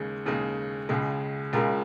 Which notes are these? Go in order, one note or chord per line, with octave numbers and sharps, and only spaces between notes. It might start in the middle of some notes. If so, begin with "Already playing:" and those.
Already playing: D#2 C#3 G#3
D#2 C#3 G#3
C#2 C#3 G#3
C#2 C#3 G#3 F4 A#4